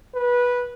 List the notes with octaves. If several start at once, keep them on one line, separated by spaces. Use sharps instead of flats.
B4